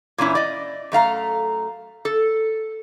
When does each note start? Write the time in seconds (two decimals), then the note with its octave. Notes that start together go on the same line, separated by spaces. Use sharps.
0.18 A#2 E3 C#4 E4
0.35 D5 D#5
0.92 F#2 A3 F5 A#5
2.05 A4